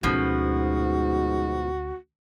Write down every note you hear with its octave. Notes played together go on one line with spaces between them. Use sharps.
D2 G#2 B2 F3 C#4 F#4